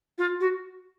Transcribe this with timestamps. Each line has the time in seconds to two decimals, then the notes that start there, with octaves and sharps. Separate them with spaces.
0.18 F4
0.40 F#4